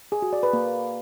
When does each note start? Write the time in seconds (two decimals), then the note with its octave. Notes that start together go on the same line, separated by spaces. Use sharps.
0.12 G#4
0.22 F#4
0.33 D5
0.43 B4
0.53 A#3